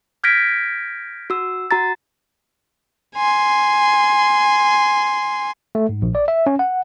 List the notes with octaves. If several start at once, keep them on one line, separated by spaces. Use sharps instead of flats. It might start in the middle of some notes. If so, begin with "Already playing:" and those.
F6 G6 G#6 A#6 B6 D7
F#4 E6
F#4 A#5 A6
G#5 C6
A3
G#2
A#1
D5
E5
C#4
F#5